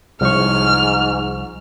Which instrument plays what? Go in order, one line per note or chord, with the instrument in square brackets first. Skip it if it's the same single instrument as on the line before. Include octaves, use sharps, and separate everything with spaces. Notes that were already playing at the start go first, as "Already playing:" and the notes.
[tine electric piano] C2 F3 C#6 [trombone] G#2 [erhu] F6